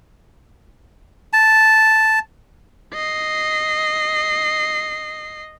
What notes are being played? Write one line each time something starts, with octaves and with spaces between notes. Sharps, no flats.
A5
D#5 C7